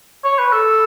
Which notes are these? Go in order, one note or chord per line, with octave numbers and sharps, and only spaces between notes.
C#5
B4
A4